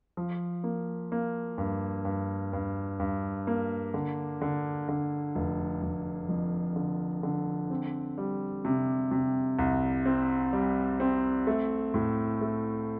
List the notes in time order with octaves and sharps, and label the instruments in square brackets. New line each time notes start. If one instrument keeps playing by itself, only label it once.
[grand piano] F3
A#3
A#3
G2
G2
G2
G2
A#3
D3
D3
D3
F1
F1
F2
D3
D3
C4
G3
C3
C3
C2
C4
G3
C4
A3
A2
A3